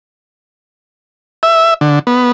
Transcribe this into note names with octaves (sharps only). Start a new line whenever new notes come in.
E5
D3
B3